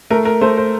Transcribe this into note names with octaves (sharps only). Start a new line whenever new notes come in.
A3 A#4
A#4
A3 C5
C5